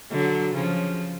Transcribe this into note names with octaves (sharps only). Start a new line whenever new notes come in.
D3 F#3
C#3 F3